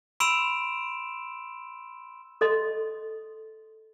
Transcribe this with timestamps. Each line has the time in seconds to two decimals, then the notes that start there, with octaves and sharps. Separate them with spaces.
0.20 B5 C6 E6 D7 E7 F7
2.41 A4 D#5 C6